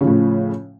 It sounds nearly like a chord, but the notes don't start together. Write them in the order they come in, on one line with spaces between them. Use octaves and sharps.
C#3 F3 A2